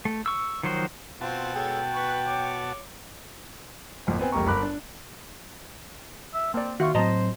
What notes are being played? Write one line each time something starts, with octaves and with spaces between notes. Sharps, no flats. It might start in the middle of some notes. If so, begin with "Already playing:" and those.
A3
C#6 E6
D#3 F3 F#3 F#4 C5
B2 C4 F4 F#4 A5
G#3 A4 C#5 G5
B4 C#6
C#5 D6
G#1 F2 A#2
B3 C4 G#5
F1 C#2 A#3 G4 A#5 C#6
G1 A#4 B5 D6 F#6
D4
E5
A#3 C4 D5
D#3 F4 F#4 E5 C#6
A2 F#3 C4 C5 D#5 A5 A#5